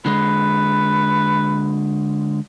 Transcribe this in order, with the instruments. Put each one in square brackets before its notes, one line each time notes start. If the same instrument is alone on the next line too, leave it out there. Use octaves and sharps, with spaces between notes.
[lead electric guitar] D3 G#3 [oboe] B4